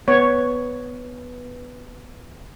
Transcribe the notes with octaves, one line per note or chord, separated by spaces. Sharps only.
B3 C#5